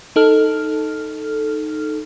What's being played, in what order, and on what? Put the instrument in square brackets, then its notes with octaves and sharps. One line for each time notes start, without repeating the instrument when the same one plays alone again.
[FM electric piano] D#4 A4 F6